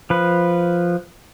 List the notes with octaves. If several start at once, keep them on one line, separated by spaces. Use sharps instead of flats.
F3 B4